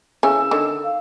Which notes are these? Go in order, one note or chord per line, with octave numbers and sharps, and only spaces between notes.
C#3 E3 C#4 E6
D3 D#3
F5